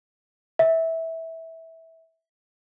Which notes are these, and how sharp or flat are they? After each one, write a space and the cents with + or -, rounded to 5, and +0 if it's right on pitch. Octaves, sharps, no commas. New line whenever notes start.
E5 -15